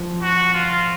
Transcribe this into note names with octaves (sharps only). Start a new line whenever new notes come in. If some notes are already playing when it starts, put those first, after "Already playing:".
Already playing: F3
F#4
F4